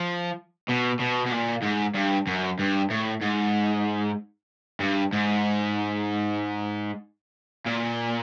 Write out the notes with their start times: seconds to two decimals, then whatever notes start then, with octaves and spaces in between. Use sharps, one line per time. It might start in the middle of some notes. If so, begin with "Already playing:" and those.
Already playing: F3
0.68 B2
0.99 B2
1.26 B2
1.32 A#2
1.63 G#2
1.95 G2
2.27 F#2
2.59 G2
2.90 A2
3.21 G#2
4.80 G2
5.13 G#2
7.66 A#2